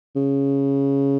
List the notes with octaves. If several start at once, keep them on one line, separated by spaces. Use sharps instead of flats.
C#3